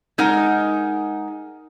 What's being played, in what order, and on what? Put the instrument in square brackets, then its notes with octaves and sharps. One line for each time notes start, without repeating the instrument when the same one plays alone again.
[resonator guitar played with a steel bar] G#3 D#4 A#4 F#5